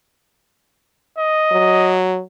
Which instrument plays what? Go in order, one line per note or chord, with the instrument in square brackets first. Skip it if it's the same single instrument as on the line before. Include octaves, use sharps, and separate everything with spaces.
[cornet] D#5
[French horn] F#3